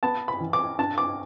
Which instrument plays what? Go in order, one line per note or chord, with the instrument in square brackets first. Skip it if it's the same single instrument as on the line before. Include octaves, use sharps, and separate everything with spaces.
[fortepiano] B3 A5
B5
E3
D6
D4 A5
D6